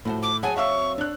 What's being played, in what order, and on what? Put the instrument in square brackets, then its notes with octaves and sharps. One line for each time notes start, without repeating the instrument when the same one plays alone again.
[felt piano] A2 [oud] F3 F#4 C5
[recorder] D6
[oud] F#3 C4 F#4 [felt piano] G#4 F#5 A5 [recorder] G#5
[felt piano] E5 F5 E6 [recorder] C#6
[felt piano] D4 F#6 [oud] C#5